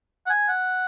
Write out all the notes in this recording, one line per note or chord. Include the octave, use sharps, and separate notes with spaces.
F#5
G#5
F#5